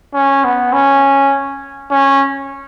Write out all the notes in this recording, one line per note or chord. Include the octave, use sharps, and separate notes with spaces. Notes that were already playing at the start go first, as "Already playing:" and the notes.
C#4
B3
C#4
C#4